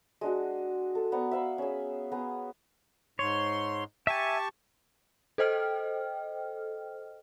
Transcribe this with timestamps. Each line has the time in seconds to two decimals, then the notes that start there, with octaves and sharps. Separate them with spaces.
0.21 G#3 D4 F#4
0.95 A4
1.12 B3 D5 A#5 C#6
1.31 E5 F5 B5
1.58 C#4 G#4
2.12 B3 G#4 A#5
3.19 G#2 C#5 C6
4.07 G4 E5 G#5 A5 C#6
5.38 A4 C5 D#5 G5 F6